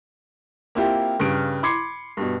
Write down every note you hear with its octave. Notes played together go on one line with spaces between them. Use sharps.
A#3 C4 E4 F4 G4
G2 C#3 D7
B5 C6 D6 G#6 C7 C#7
G2 B2